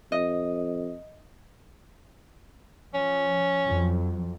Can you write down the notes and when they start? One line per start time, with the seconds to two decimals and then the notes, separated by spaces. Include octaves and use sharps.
0.12 F2 D#5
2.94 F3 C#4
3.66 F2 F#3